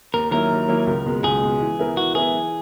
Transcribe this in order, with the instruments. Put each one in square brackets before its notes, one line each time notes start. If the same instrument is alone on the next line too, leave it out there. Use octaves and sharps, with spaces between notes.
[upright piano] D#2 [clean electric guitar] A#4
[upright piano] D#3 F#3 A#3 E4 [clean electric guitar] A#4
[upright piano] D#2
D#3 F#3 A#3 E4
C#2
B2 G#3
[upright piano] C#2 [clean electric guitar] G#4
[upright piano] B2 G#3
E3
B3 E4 A#4
[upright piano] E3 [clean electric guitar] F#4
[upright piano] B3 E4 A#4 [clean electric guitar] G#4
[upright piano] E3